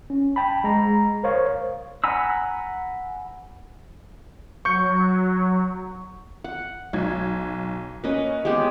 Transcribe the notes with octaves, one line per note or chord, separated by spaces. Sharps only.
C#4
G5 A5 B5
G#3 A#5
A#4 C5 C#5 F5
F#5 G#5 A#5 B5 E6
F#3 C#6 G6 C#7
F#5
B1 G#6
A#3 C#4 B4 D#5
G#3 B3 G4